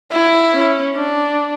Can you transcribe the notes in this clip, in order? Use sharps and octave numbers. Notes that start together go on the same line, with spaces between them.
E4
C#4
D4